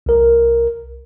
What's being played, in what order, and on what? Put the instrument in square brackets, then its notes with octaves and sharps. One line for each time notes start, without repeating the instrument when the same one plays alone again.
[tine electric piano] C2 A#4